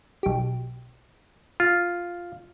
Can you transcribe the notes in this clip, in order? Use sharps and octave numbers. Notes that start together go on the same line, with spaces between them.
B1 G4
F4